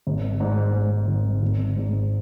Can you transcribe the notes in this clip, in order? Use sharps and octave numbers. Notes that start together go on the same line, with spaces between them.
G#1
G#2
G#2
G#1
G#1
G#2